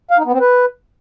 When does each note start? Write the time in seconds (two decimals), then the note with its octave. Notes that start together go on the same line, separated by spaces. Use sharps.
0.11 F5
0.18 D#4
0.25 B3
0.33 C4
0.40 B4